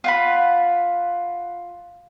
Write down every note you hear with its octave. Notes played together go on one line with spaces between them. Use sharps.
F4 F#5 B5